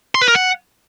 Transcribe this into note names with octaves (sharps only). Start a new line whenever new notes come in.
C6
B4
A#4
F#5